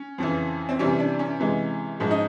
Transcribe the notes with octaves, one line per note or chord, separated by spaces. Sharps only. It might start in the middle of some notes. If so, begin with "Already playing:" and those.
Already playing: C#4
F2 C#3 E3
C4
C3 E3 G3 C#4
D4
C#4
C3 E3 G#3
G#2 F3 G#3 C#4
D#4